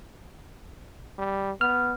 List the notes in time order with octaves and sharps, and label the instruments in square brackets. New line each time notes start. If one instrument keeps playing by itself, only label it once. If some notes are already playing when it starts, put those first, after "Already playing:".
[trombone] G3
[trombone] B3 [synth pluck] F6